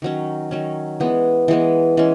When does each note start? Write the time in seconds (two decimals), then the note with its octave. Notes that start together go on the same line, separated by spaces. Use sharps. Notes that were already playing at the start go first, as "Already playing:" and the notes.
0.02 D#3 F#3 C#4
0.51 D#3 F#3 C#4
1.00 E3 G#3 B3
1.48 E3 G#3 B3
1.97 E3 G#3 C#4